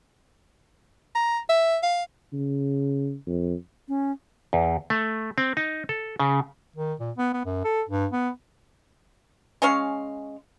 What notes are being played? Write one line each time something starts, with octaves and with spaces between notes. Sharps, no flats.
A#5
E5
F5
C#3
F2
C#4
E2
A3
C4
D#4
A4
C#3
D#3
A#2
B3
B3
F#2
A4
G2
B3
G#3 C#4 C#5 F5